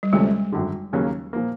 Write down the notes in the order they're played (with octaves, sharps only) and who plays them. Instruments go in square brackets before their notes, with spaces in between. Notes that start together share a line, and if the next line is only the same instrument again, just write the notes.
[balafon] G3
[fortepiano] D2 C3 F3 A3 C#4 [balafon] G#3
[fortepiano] G#1 F#2 D3
D#2 C#3 F#3 A#3 C#4
A#2 F3 A#3